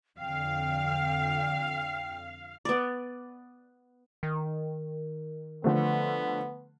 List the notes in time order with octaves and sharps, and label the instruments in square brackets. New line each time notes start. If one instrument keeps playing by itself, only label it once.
[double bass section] F2 D3 [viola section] F5 [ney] G5
[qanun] B3 D5
[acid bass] D#3
[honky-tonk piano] D3 F3 A3 [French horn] B3